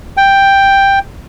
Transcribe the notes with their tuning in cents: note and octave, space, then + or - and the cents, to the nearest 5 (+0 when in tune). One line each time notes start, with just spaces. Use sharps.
G5 +5